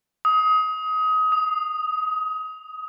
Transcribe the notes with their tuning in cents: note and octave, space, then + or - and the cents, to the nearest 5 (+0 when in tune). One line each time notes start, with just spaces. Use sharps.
D#6 +25
D#6 -5